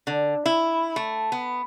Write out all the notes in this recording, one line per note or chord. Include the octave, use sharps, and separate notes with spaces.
D3
E4
A3
B3